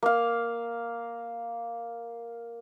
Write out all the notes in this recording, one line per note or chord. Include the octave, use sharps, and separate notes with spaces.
A#3 F5